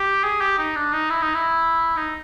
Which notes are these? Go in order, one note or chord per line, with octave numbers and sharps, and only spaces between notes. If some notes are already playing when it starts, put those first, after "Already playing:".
Already playing: G4
G#4
G4
D#4
D4
D#4
E4
D#4
E4
D#4